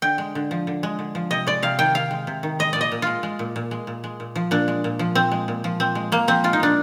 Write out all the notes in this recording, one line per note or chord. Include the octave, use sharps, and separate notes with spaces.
D3 G5
G#3
D3
F3
D3
G#3
D3
F3
C3 D#5
G#3 D5
C3 F5
D#3 G5
C3 F5
G#3
C3
D#3
G#3 D#5
A#2 D5
D#5
A#2
G#3 F4
G#3
A#2
A#2
G#3
A#2
G#3
A#2
F3
A#2 D4
G#3
A#2
F3
A#2 C4
G#3
A#2
F3
A#2 C4
G#3
A#2 A#3
F3 C4
G#3 F4
D#4
A#2 D4